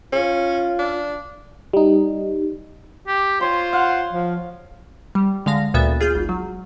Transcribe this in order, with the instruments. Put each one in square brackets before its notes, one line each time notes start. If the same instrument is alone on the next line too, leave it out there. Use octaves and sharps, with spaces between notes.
[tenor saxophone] C#4 [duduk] F4
[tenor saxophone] D4
[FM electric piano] G3 D#4
[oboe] G4
[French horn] F4 [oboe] C5 [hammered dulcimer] C#5 C6
[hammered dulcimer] F5 [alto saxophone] F#5
[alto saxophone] F3
[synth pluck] G3
D3 G#3 F5 A#6
D2 A#2 B3 E5 A6
F4 G#4 F6 G6
G#1
F#3